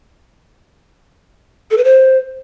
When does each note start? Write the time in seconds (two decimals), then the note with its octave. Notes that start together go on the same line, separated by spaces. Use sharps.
1.71 A4
1.78 B4
1.84 C5